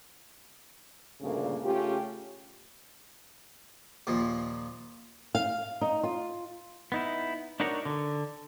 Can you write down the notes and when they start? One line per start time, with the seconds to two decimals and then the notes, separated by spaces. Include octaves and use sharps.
1.21 D2 G2 A#2 C#3 A3 A#3
1.64 C#3 A3 C#4 F4 G4
4.07 D#2 A#2 F3
5.35 F5
5.81 D#4
6.03 F4
6.92 B3 D#4 E4
7.60 D4 D#4 F#4 A#4 C#5
7.85 D3